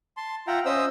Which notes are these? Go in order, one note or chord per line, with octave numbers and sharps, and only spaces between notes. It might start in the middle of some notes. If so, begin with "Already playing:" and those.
A5 C6
F4 E5 F#5 G5 A#5
C#4 C5 D#5 E5 D#6 E6